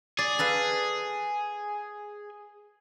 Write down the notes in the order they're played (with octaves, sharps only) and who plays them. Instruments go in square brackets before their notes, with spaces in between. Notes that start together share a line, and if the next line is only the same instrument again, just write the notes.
[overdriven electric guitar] G#4 [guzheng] D5
[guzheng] A4 B4 F5